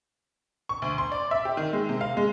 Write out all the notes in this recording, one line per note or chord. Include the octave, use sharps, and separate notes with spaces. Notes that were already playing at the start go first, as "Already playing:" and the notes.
C#6
D2
C6
D5
E5
G4
D#3
G#3
C3
F5
G#3